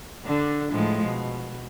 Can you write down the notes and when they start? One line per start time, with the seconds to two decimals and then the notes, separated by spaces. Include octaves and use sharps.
0.25 D3 D4
0.72 A2 F3 G#3
1.05 B2